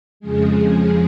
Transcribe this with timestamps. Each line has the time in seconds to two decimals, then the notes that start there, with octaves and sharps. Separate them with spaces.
0.20 F2 C#3 F3 G#3 G#4
0.67 G#4